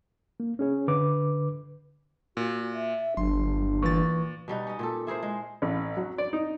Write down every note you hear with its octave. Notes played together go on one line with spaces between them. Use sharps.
A#3
C#4 G#4 C#5
D3 B4 D6
A#2 F#4
E5
G1 F#3 D4 C6
A#2 E3 B4 C#6 A6
B2 G3 D#4 F#5
C#4 D#5
A#2 G4 A4
E4 G#4 A#4 C5
G#3
A1
F#3
D5
D#4